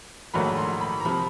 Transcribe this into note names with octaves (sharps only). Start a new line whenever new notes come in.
A#1 G#2 D#3 F#3 A3 B5
C6
B5
A#5
C3 F3 B5